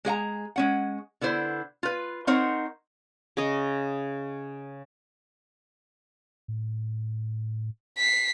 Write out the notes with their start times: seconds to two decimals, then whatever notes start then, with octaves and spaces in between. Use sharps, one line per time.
0.05 G#3 G#4 F#5 A#5
0.56 G#3 C#4 F#5
1.21 D3 B3 E4 C5
1.83 F4 B4
2.27 C4 D#4 A#4 C5 C#5 F#5
3.37 C#3 C#5 D#5
6.48 A2
7.98 B6 C7